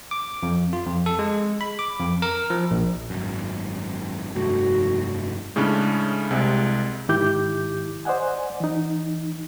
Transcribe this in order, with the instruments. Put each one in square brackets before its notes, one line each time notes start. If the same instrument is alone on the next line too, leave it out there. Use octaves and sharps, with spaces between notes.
[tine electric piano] D6
F2
F4
F2
A4
G#3
B5
D6
F2
A#4
F3
A#1
[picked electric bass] G#1 F#2
[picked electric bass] F1 G2 A3 [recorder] F#4
[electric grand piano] A2 C#3 G#3 C#4 D4
C2 C3 G#3 C4
[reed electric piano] G#2 D#3 E4 G4 D6 G6
C5 D5 D#5 F#5 G#5
E3 D#4